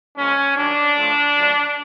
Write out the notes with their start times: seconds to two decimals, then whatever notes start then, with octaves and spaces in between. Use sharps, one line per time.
0.17 A#2 F3 G#3 C#4
0.56 F#2 D#3 F#3 D4
0.96 A2 F3 A3
1.35 F#2 D3 F3 A3